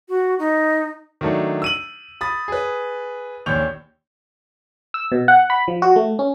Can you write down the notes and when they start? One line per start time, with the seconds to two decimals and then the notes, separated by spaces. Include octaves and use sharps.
0.09 F#4
0.39 D#4
1.21 D#3 F#3 A3 D4
1.62 E6 D#7 F#7
2.21 B5 D#6 A6
2.48 G#4 B4
3.46 A#1 D#2 C#5 G6 F7
4.94 E6
5.12 B2
5.28 F#5
5.50 B5
5.68 F3
5.82 F#4
5.96 A3
6.19 C#4